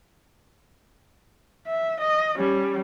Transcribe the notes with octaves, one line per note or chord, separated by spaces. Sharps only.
E5
D#5
G3 C#4